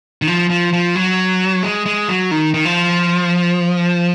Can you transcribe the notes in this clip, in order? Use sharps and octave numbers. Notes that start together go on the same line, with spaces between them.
D#3
F3
F3
F3
F#3
G#3
G#3
F#3
D#3
D#3
F3